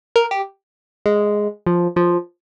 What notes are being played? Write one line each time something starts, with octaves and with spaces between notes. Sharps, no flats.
A#4
G4
G#3
F3
F3